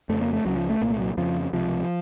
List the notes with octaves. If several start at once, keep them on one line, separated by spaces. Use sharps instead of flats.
F2 C#3 A3
A#3
A3
C#2 C#3 F#3
F3
A3
C2 A#2 A#3
A3
F#3
F2 C#3 F3
C#2 C3 F3